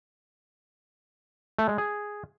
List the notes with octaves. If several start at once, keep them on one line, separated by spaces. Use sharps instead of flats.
A3
G#3
G#4